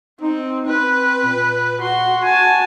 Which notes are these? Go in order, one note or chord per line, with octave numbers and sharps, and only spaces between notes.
C4 D#4
C4 B4
A#2
F#4 C6
G#5 A5